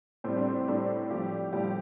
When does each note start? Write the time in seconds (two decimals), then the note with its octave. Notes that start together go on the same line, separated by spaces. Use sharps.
0.24 A2 G3 C4
0.37 D4
0.48 C4
0.68 A2 G3 D4
1.10 A2 F3 G3 G4
1.53 A2 F3 G3 G4